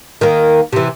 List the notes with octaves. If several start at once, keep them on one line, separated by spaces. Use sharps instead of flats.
D#3 A#3
C3 E3